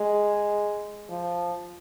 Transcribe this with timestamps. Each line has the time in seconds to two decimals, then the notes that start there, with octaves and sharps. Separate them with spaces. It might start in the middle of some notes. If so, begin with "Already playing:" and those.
Already playing: G#3
1.10 F3